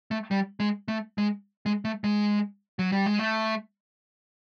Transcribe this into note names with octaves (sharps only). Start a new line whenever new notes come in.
A3
G3
G#3
A3
G#3
G#3
A3
G#3
F#3
G3
G#3
A3